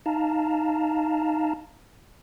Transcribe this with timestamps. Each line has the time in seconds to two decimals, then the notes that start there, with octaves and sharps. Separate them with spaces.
0.06 D#4 F5 A5 A#5